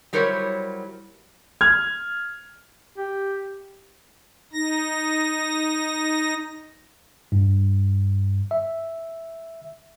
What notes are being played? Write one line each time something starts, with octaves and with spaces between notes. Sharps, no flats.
F#3 G3 E4 A#4 C5 C#5
F6 G#6
G4
D#4 A#6
G2
E5